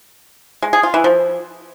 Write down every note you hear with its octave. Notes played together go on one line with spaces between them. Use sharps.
G#3
G#4
F4
E3
F3